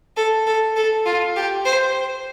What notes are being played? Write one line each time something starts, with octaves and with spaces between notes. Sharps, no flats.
A4
A4
A4
F4
G4
C5